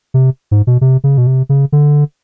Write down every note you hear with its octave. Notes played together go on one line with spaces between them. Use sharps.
C3
G#2
B2
C3
C#3
B2
C3
C#3
D3